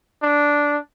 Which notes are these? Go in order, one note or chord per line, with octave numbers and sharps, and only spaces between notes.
D4